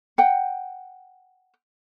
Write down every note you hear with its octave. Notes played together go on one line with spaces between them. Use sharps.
F#5 G5